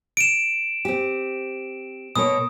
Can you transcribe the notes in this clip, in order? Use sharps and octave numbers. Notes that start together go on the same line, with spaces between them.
D7 E7
C4 G4
B2 A#3 C#5 D#6